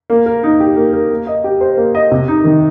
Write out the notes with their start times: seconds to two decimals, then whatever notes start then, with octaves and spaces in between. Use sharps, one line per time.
0.10 A#3
0.26 A#4
0.43 D#4
0.60 G4
0.76 A#3
0.93 A#4
1.10 A#3
1.27 D#5
1.44 G4
1.61 C5
1.77 A#3
1.95 D#5
2.11 C3
2.28 D#4
2.44 D#3